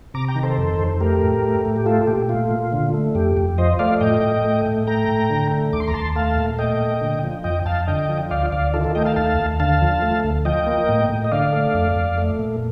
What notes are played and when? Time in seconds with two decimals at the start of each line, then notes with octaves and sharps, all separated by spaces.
0.14 C3 A#5 D6
0.28 G5 A#5
0.35 D#3
0.43 A4 C5
0.58 F2
0.79 F2
1.00 A3 G4 A#4
1.22 A2
1.43 A3
1.65 A2
1.76 G4
1.86 A3 F4 A4
2.07 A#2 G4
2.29 A3 F4
2.51 A#2
2.72 D3
2.94 A3
3.15 F2 G4
3.37 F2
3.58 F3 C5 D#5
3.79 A3 D5 F5
4.00 A2 D#5 G5
4.22 A2
4.44 A3
4.66 A2
4.87 A3 G5 A#5
5.08 A2
5.30 D3
5.51 A3
5.73 D#2 D6
5.80 C6
5.88 A#5
5.94 D#2 A5 C6
6.16 A3 F5 A5
6.37 A#2
6.58 A3 D#5 G5
6.80 A#2
7.01 D3
7.24 F3
7.44 F2 D#5 G5
7.66 F2 F5 A5
7.87 D3 D#5 G5
8.09 F3
8.30 D2 D5 F5
8.52 D2 D5 F5
8.73 D#3 F4 A4
8.84 F4 A4
8.95 A3 D#5 G5
9.05 F5 A5
9.16 D#2 F5 A5
9.38 D#2
9.60 D3 F5 A5
9.81 F3
10.02 A3
10.24 D2
10.45 F3 D#5 G5
10.66 A#3
10.89 A2
11.09 A2
11.24 D#5
11.31 D3 D5 F5
11.53 A3
11.74 F2
11.96 F2
12.18 A3
12.39 A#2